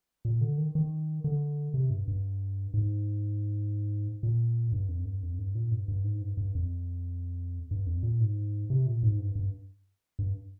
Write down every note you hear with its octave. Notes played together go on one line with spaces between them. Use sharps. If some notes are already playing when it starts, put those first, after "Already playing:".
A#2
D3
D#3
D#3
D3
C3
G2
G2
G#2
A#2
G2
F2
G2
F2
G2
A#2
G2
G2
G#2
G2
G2
F2
G2
F2
A#2
G#2
C3
A#2
G#2
G2
G2
G2